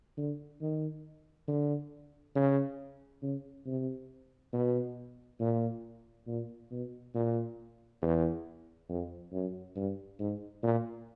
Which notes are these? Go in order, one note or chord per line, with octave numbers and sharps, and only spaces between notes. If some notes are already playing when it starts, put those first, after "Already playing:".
D3
D#3
D3
C#3
C#3
C3
B2
A#2
A#2
B2
A#2
E2
F2
F#2
G2
G#2
A#2